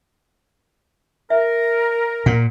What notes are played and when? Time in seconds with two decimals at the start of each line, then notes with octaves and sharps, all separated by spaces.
1.30 A#4 E5
2.26 A#2 F#5